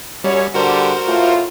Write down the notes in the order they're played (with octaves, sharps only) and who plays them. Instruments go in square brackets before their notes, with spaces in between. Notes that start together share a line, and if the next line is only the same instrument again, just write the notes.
[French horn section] F#2 C#5 [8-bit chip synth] G3
[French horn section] D3 G3 [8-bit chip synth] F#4 A#4 C5
[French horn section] A2 A3 F4